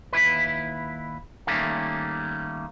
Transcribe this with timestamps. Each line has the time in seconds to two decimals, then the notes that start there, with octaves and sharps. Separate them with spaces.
0.13 D#2 E4 B4
1.47 D#3 G3 A3 A#3 C#4